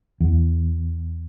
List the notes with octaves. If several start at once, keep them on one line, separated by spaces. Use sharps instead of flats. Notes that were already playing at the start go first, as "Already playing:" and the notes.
E2